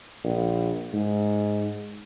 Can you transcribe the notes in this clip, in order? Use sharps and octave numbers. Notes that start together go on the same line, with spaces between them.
A#1
G#2